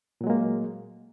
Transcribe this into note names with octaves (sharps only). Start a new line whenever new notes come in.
A#2 F#3 G#3 A#3